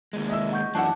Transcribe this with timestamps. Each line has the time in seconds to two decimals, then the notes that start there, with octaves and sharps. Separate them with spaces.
0.13 D#2 G#3
0.29 D#5 E5 E6
0.52 F#5 C#6 G6
0.75 F#2 E3 D4 E4 F#5 A5